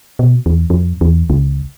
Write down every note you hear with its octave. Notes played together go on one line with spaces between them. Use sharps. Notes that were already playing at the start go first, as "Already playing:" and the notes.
B2
E2
F2
E2
C#2